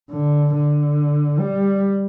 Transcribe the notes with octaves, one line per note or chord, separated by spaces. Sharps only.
D3
D3
G3